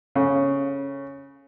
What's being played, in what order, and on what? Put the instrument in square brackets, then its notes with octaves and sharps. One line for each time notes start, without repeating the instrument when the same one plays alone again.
[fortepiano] C#3 [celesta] A4 C#5